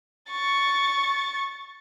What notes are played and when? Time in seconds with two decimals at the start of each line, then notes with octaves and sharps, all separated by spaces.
0.31 C#6 A6